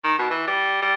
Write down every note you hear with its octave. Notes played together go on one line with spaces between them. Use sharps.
D#3
B2
E3
G3
G3